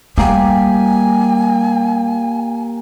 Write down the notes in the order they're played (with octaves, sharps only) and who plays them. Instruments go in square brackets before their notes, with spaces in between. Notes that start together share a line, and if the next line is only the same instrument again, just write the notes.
[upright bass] G3 [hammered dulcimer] A#3 G4 [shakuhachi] G#5